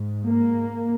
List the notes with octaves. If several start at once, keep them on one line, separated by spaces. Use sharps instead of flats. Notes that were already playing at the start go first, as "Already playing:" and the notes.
Already playing: G#2
A#3